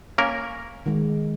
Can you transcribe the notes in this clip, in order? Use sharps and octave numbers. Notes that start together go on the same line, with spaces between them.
A#3 C#4 A#4
D#3 G#3